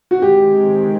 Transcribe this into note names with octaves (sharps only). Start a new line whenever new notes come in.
F#4
D#3 G#3 C4 G4